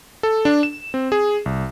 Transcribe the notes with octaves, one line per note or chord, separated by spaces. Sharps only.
A4
D4
E7
C4
G#4
C2